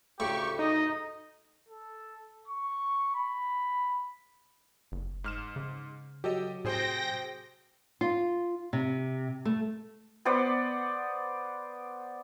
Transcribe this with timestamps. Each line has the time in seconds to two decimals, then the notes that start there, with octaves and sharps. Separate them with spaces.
0.20 D2 A2 C#3 G4 C#6
0.59 D#4 D#5
1.69 A4
2.48 C#6
3.15 B5
4.92 F#1
5.24 G#2 F6 E7
5.56 C#3
6.24 F#3 G4 A4 D#5
6.65 A2 C3 G#4 C5 G5 A#6
8.01 F4
8.73 C3
9.45 A3
10.25 B3 C5 D5 F#5